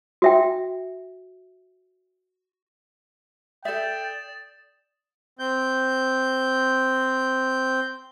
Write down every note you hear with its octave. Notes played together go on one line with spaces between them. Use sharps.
F#4 E5 G5
A4 D5 E5 G5 D#6 A6 E7
C4 G6